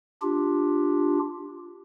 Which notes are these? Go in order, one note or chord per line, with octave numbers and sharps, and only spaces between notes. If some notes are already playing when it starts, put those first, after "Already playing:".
D4 F4 G4